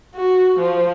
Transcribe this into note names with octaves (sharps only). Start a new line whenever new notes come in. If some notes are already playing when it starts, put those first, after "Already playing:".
F#4
F3